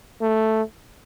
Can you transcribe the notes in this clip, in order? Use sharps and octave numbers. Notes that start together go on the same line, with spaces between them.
A3